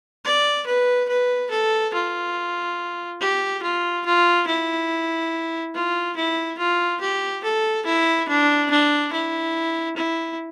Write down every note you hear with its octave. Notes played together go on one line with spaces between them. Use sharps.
D5
B4
B4
A4
F4
G4
F4
F4
E4
F4
E4
F4
G4
A4
E4
D4
D4
E4
E4